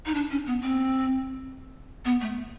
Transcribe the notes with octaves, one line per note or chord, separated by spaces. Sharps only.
D#4
D4
C#4
B3
C4
B3
A3